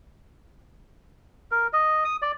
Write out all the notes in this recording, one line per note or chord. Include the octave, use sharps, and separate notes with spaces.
A#4
D#5
D#6
D5